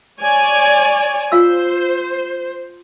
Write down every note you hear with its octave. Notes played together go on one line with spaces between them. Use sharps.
C#5 D5 G#5
F4 C5 F5 E6